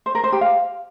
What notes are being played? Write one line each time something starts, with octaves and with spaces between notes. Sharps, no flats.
C5
A#4
C5
G4
F5